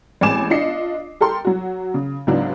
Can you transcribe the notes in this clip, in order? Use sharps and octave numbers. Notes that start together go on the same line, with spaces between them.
A1 G#3 C4 G#5 D6 E7
D4 F4 D#5 C7 C#7
G4 A4 A#4 C6
F#3 F#4
C#3
C#2 G#2 F#3 B3 D4